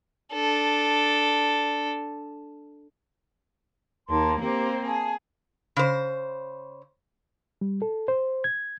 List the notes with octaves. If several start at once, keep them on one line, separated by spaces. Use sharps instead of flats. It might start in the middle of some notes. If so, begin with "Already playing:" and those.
D4 A4
D#2 A#3 D#4 A5 C6
A#3 C4 G4 C5
G#4 F5 A5
C#3 C5
G3
A4
C5
G#6